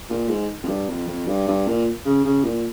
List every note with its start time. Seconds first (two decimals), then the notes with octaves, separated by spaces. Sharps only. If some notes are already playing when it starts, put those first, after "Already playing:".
0.09 A#2
0.29 G#2
0.63 F2
0.68 G2
0.88 F2
1.07 F2
1.27 G2
1.47 G2
1.67 A#2
2.05 C#3
2.25 C#3
2.44 A#2